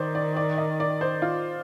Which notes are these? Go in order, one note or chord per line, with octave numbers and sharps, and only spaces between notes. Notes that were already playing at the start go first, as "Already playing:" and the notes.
Already playing: D#3 C5 D5
D5
D5
D#5
D5
C5
F4